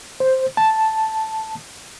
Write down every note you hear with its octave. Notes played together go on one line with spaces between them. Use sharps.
C5
A5